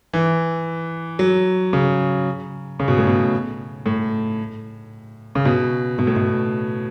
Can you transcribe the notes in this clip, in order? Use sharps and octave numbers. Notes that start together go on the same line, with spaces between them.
E3
F#3
C#3
C#3
B2
A2
B2
A2
C#3
B2
B2
A2
B2